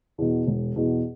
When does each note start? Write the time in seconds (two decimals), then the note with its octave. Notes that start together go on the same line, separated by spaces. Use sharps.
0.18 E2 B2
0.47 E1
0.76 E2 B2